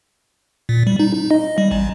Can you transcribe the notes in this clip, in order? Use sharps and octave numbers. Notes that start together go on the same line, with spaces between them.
A#2
G3
D#4
D#4
D#5
G3
A1